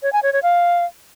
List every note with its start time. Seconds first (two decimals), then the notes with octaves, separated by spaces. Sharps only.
0.03 C#5
0.13 G#5
0.23 C#5
0.33 C#5
0.43 F5